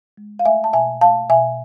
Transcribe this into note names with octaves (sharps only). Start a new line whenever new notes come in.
G#3
F5
A3 E5 G#5
A5
B2 E5 G#5
A3 F5 A5
B2 E5 G#5